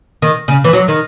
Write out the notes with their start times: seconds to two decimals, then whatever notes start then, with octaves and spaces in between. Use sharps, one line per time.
0.22 D#3
0.48 C#3
0.64 E3
0.73 F#3
0.88 D#3